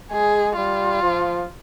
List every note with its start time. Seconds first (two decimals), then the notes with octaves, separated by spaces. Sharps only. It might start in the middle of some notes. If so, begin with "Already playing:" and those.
0.11 G#3 G#4
0.56 G3 F4
1.03 F3